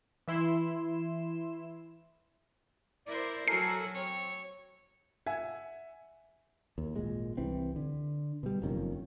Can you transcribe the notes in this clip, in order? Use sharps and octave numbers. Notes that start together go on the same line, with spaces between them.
E3 E4 C6 E7
E4 A#4 C5 D5
F#3 F#4 A4 A#4 G#5 C7
C4 C#5
E5 F#5 G#5 G#6
D#2
G#1 A#2 G#3
C2 E3 C4
D3
B2 G3
F#1 F2 D#3 C#4